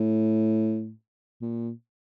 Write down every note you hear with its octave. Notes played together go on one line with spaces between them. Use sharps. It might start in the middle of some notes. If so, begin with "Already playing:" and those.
Already playing: A2
A#2